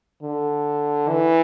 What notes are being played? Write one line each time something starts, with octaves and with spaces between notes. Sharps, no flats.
D3
E3